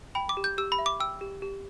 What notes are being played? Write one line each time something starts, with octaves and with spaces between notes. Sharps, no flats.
G5 B5
D6
G4
G6
G4 E6
B5
E5
D6
G5 E6
G4
G4